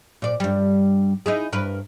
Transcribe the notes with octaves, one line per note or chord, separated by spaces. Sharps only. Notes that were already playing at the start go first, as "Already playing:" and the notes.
A#2 D5
G2 G3
D#4 E4 G#4
G2 A#4 B4